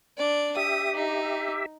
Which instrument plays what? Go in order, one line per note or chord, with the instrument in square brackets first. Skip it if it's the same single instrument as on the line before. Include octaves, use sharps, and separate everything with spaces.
[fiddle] D4 D5
[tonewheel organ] G4 E5 [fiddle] D#6
[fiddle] D#4